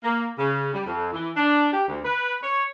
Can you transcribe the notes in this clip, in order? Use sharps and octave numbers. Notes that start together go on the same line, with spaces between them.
A#3
C#3
G3
F2
E3
D4
G4
D2
B4
C#5